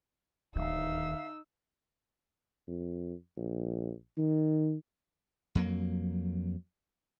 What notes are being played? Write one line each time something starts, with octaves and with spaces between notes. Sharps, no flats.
D1 D#2 D#3 D#4 E5 F5 E6
F2
A#1
D#3
F2 F#3 A#3